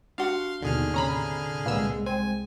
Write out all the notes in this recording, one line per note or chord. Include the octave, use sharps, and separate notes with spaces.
D4 F#4 F5 F#5 C6
D#2 B2 D3 D#3 G#4 F6
A2 C3 C#4 A#5 B5
C2 A#2 G#3 B3 E6
C4 G#5